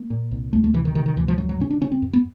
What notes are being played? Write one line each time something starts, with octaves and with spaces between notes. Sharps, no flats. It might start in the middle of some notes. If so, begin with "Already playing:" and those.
Already playing: A#3
A#2
C2
D2 A3
A3
C3 E3
D#3
C3 D#3
D#3
D2 E3
F3
F#2 F#3
F#3
C#3 C#4
D4
C#3 C#4
C4
F#2
B3